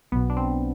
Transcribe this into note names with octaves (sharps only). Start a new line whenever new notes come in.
B1 B2 B3
D4
C4